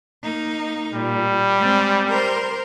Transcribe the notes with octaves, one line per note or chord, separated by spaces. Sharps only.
A#3 D#4
A#2 G3
G#3 C4
A#4 C5